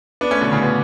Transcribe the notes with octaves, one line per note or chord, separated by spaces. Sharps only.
B3 D4
A3 C#4
B2 D3
A2 C#3
B2 D3